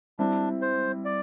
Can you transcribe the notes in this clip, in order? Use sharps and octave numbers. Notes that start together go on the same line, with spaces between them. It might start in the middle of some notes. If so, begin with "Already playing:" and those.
G3 C4 D4 E4
C5
D5